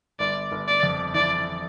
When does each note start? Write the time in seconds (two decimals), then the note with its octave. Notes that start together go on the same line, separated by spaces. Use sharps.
0.20 G1 D5
0.52 G1
0.68 D5
0.83 F2
1.14 E3 D5